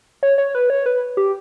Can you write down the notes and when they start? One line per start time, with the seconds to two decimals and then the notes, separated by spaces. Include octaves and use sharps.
0.23 C#5
0.38 C#5
0.55 B4
0.70 C#5
0.86 B4
1.17 G4